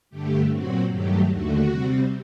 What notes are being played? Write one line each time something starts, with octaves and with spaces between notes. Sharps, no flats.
G2 D3 A3 G4
A#2 F#3 C4 F#4
G2 D#3 F#3 A3 G4
D#2 D3 A3 F#4
C3 G3 C4